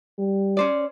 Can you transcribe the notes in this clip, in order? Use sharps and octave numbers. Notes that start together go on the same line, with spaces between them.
G3
C#4 C5 D5